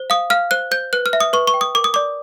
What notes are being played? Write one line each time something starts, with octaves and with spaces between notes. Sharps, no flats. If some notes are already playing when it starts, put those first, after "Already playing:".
Already playing: C5
F5 D#6
F5 F6
C5 F#6
C5 G6
B4 F#6
F6
E5
D#6
B4 C#6
C#6
G5
D#6
A#4 D6
D#6
D5 D6